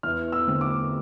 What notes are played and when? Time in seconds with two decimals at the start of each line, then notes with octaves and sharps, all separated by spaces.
0.03 E2 F6
0.32 E6
0.47 D3 A3 C4
0.61 D6